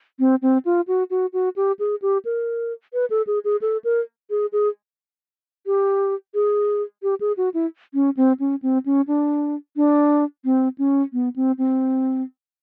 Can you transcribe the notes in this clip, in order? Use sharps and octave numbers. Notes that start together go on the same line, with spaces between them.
C4
C4
F4
F#4
F#4
F#4
G4
G#4
G4
A#4
B4
A4
G#4
G#4
A4
A#4
G#4
G#4
G4
G#4
G4
G#4
F#4
E4
C#4
C4
C#4
C4
C#4
D4
D4
C4
C#4
B3
C4
C4